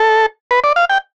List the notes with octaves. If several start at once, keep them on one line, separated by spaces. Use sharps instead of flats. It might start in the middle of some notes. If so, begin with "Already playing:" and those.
Already playing: A4
B4
D5
F5
G5